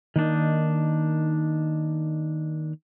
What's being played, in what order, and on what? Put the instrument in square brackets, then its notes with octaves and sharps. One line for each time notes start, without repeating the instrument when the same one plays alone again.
[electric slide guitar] D#3 A#3 D4 D#4